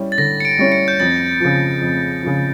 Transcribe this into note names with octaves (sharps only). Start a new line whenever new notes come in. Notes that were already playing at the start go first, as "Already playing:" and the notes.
Already playing: G3 C#4 E4
A6
D3 A#6
C#7
D7
G3 C#4 E4
C#7
G6
F2 A6
C#3 F3
F2
C#3 F3